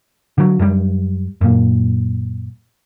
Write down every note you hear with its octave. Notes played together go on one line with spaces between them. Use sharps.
D3 F#3
F#2 G3
F#2 A#2